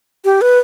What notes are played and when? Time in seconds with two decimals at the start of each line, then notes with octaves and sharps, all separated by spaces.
0.25 G4
0.41 B4